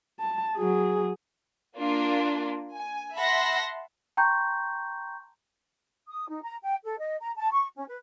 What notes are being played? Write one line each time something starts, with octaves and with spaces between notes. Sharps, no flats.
A5
F#3 G#4
A#3 D4 F4
G#5
E5 F#5 A5 B5 C6 A#6
G5 A5 A#5 C6 C#6 G6
D#6
D#4
A#5
G5
A4
D#5
A#5
A5
C#6
C#4
B4